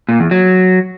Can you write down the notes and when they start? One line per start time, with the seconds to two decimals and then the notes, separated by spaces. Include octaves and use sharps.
0.09 A#2
0.20 E2
0.31 F#3